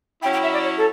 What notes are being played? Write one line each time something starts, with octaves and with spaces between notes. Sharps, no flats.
F#3 C#4 E4 G5
G5
E5
D5
C#5
A4